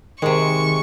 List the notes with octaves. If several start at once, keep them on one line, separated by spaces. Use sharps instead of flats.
C3 D#3 G#3 C#6